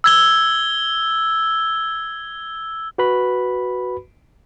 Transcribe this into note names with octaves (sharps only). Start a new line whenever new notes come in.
E6 G#6 G7
F#4 B4 B5